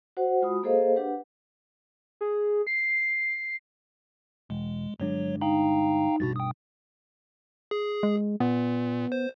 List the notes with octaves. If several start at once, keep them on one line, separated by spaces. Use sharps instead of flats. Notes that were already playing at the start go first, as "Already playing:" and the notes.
F#4 C5 F#5
G#3 F4 F#4 B5 D#6
A#3 G#4 A4 C5 D#5 F5
D4 G4 B4 F#5
G#4
C7
E1 G#3
G1 F#3 G#3 D4 C#5
D#4 F5 G5 A#5
A#1 G2 B2 F#4 A6
G5 D#6
G#4
G#3
A#2 B3
C5